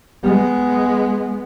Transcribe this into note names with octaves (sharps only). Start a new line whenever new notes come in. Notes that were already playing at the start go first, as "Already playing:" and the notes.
G#3 B3